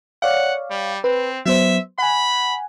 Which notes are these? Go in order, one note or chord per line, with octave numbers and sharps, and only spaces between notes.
C#5 D5 F5 F#5
G3
C4 B4
F#3 B3 C5 E5
F#5 G#5 B5